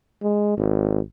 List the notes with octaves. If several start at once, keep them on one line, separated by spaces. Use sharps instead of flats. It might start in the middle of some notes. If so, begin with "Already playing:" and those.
G#3
G#1